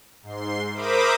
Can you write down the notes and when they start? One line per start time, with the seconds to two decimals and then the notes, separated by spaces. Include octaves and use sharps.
0.23 G#2 C6
0.73 A#4 C5 E5 B5 D6 D#6